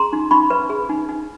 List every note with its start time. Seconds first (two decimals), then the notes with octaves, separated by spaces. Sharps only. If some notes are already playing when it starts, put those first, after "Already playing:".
Already playing: G#4 A#5 C6
0.13 D#4
0.31 D#4 B5 C#6
0.50 B4
0.70 G#4
0.89 D#4
1.09 D#4